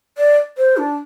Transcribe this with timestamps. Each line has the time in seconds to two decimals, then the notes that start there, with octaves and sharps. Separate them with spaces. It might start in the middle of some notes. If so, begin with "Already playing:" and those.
0.18 D5
0.57 C5
0.77 D4